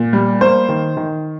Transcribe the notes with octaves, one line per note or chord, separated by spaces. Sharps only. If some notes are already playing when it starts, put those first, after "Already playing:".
Already playing: A#2
G3
A#3 C5
D#3
D#3